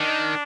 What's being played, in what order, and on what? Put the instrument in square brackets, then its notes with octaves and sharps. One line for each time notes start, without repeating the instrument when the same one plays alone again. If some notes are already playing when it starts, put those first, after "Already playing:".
Already playing: [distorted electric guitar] D#3 [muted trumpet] D4